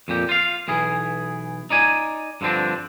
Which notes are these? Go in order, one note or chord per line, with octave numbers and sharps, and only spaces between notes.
F2 A#2 G4
F4 F5
B1 E3 G#4
D#4 D5 G#5
G2 D3 F3 C4 D4